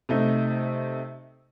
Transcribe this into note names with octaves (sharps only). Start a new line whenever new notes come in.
C3 A3 D#4